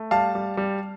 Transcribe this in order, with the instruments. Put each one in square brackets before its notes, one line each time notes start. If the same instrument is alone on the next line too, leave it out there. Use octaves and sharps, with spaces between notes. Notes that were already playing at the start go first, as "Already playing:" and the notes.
Already playing: [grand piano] A3
G3 F5 A5
G3
G3